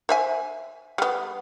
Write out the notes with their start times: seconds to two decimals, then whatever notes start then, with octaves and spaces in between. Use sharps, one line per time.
0.09 C5 E5 G#5
0.98 G3 B3